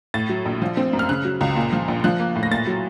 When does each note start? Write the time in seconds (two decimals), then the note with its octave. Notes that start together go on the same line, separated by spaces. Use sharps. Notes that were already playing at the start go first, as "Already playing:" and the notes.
0.14 A2 A6
0.29 F#3
0.45 A#1
0.62 F3
0.77 C4
0.93 F#2
0.99 F6
1.09 C#3 F#6
1.25 F#3
1.41 C#2
1.56 A#2
1.73 F3
1.88 A#1
2.04 F3 F#6
2.20 A#3
2.36 A2
2.43 A#6
2.52 A#2 A6
2.67 F#3